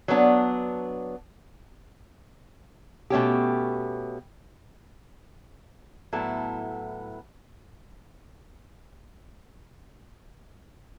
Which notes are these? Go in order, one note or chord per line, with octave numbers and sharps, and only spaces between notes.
F#3 B3 D4
B2 A3 C#4 G4
A2 F#3 B3 E4 A4